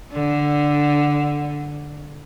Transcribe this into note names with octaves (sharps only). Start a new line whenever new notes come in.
D3